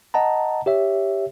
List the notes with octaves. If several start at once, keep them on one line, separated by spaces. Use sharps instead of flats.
D#5 F#5 A5 A#5
G4 C#5 E5